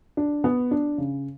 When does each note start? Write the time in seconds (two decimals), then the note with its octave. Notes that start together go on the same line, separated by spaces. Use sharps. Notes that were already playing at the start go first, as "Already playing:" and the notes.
0.17 D4
0.44 B3
0.71 D4
0.98 C#3